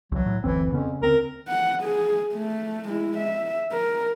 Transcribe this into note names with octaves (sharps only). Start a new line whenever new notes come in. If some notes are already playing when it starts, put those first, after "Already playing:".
C2 E3 F#3
A2
F#1 D2 E3 C4
F2 C#3 B3 C#4
D2 C4 A#4
F#5
G#4
A3
G#3 E4
E5
A#4